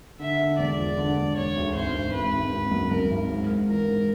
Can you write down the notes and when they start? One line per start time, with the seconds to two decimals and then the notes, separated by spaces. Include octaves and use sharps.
0.20 D3 E5
0.39 D3
0.58 E1 D5
0.78 F3
0.97 D3
1.17 E1
1.36 E1 C#5
1.56 D2
1.75 G#1 C5
1.94 G#1
2.13 G#1 B4
2.33 G#1
2.52 G#1
2.72 F#2
2.91 F#2 A#4
3.11 G#1
3.30 G#2
3.50 G#2
3.68 E3 A#4
3.88 G#2